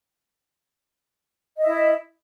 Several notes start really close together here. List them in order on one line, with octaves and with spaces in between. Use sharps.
D#5 E5 E4